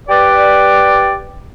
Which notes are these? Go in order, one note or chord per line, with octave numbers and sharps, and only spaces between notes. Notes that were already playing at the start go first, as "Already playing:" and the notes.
G4 B4 D5